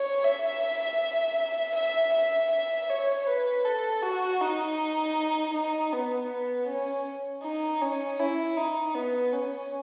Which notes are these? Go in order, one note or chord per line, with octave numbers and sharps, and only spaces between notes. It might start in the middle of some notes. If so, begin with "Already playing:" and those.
Already playing: C#5
E5
E5
E5
E5
C#5
B4
A4
F#4
D#4
D#4
B3
B3
C#4
D#4
C#4
E4
D#4
B3
C#4